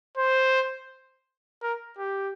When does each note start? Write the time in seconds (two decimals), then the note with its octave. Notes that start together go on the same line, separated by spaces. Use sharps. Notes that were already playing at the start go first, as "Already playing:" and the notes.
0.17 C5
1.63 A#4
1.98 G4